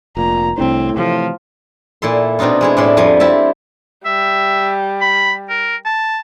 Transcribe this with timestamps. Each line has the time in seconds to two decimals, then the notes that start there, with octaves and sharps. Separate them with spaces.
0.17 F1 A#2 A#5
0.58 C2 A2 C3 C4 D4
0.97 C3 E3 F3 A3
2.02 A#2 E4 A4 C6
2.39 B2 C4 D4 D#4 F4
2.61 G#3 E4 G#4
2.77 A2 G3 D4 A4 E5 C6
2.97 F2 F3 G3 G#5
3.20 C4 E4 E5 A5
4.05 G3 E5
5.01 B5
5.49 A#4
5.85 A5